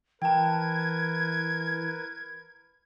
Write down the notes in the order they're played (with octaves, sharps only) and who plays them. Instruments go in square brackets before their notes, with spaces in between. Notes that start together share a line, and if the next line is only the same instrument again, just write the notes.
[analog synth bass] E3 [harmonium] A#4 B4 [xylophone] G5 A5 [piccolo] G#6